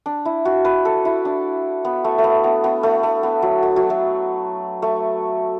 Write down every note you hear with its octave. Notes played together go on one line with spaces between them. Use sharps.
D4
E4
F#4
B4
A4
E4
D4
B3
A3
A3
B3
B3
B3
A3
A3
B3
F#3
A3
F#3
A3
A3